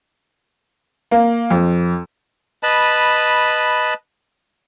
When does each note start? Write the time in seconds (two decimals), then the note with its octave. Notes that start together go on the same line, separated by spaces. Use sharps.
1.11 A#3
1.50 F2
2.63 B4 D#5 A5 B5